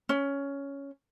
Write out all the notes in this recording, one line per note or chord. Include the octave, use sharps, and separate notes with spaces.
C#4